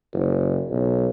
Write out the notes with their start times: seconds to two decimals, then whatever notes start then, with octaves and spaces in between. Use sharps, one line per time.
0.14 F#1
0.70 B1